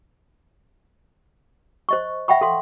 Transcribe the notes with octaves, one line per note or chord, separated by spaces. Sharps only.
C5 D#5 C#6
E5 F#5 G5 B5 C#6
A4 F5 C6